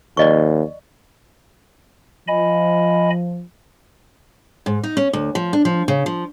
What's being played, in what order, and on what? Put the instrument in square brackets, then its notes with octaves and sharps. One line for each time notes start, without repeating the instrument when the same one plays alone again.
[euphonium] D#2 [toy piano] D5 D#5 C#6
[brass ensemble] F3 [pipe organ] D#5 G#5 B5
[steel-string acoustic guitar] G#2
D#4
C#4
D2
F3
D4
F3
C#3
F3